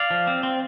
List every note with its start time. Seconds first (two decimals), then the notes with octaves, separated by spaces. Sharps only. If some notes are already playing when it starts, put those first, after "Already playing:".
Already playing: D5 F5
0.11 F3
0.27 C4
0.43 C4